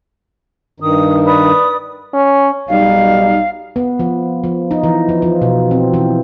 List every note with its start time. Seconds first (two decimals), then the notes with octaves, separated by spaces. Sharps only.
0.80 G2 D#3 D#6
1.25 B4 D5 D#6
2.14 C#4
2.69 B1 G3 D#4 F5
3.76 B3
3.99 F3
4.44 F3
4.71 D#4
4.83 E3
5.09 F3
5.22 F3
5.42 B2
5.71 C4
5.94 E3